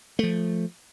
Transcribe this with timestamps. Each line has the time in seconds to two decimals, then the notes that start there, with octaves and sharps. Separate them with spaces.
0.19 F3 A3